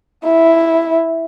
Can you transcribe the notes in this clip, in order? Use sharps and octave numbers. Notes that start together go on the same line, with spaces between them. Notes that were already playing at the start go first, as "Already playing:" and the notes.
E4